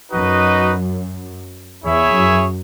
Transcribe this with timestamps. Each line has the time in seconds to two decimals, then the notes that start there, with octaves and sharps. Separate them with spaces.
0.11 F#2 D#4 F#4 B4 D#5
1.84 E2 E4 G#4 C#5 E5
2.13 F#2